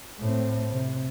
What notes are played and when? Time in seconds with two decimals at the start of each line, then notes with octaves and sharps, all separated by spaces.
0.20 A2 C4
0.71 C3